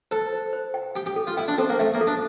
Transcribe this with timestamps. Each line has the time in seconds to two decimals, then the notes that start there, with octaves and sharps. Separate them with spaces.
0.11 A4 C5
0.33 C5
0.53 C5
0.74 G5
0.95 G4 G5
1.06 G4
1.16 A4
1.27 F4
1.37 E4 G5
1.48 D4
1.58 C4 A4
1.69 A#3
1.79 A3 E5
1.94 A#3
2.01 A4
2.07 D4